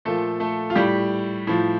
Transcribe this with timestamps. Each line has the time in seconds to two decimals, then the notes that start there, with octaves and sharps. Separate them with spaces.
0.05 A#2 F3 A3 A4
0.40 A3 A4
0.70 F4
0.75 A2 G3 G4
1.47 A2 F3